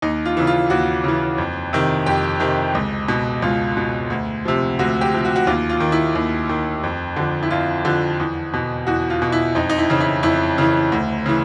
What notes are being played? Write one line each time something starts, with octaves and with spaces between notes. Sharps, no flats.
D#2 D#4
F4
C#3 E3
F4
D#2 F#4
C#3 E3
F2
C3 D#3
F2 G4
C3 D#3
C#2
B2
C#2 F4
B2
D2
C3 F3
D2 F#4
G4
C3 F3
F#4
F#4
D#2 F4
F4
D#3
E4
D#2
D#3
F2
D3 F3
E4
F2 F4
D3 F3
E2
B2
E2 F#4
F4
B2
E4
F2 D#4
D#4
E4
C#3 E3
E4
F2 E4
C#3 E3
D2
C#3 E3